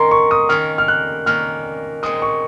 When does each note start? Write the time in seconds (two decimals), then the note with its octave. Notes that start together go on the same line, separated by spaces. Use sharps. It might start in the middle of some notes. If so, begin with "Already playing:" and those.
Already playing: D#3 A#3 C#4 A#5 C6
0.11 C#6
0.31 D#6
0.49 D#3 A#3 C#4 F6
0.78 F6
0.88 F#6
1.26 D#3 A#3 C#4 F6
2.03 A#2 G#3 C4 D#4 D#6
2.22 C#6